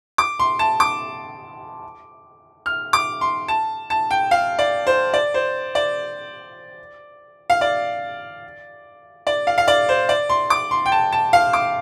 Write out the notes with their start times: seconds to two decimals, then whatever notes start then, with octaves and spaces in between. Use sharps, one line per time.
0.18 D6
0.39 C6
0.59 A5
0.80 D6
2.66 F6
2.93 D6
3.21 C6
3.48 A5
3.90 A5
4.11 G5
4.31 F5
4.59 D5
4.87 C5
5.14 D5
5.34 C5
5.75 D5
7.50 F5
7.61 D5
9.27 D5
9.47 F5
9.58 F5
9.68 D5
9.89 C5
10.09 D5
10.29 C6
10.50 D6
10.71 C6
10.86 G5
10.92 A5
11.12 A5
11.33 F5
11.53 D6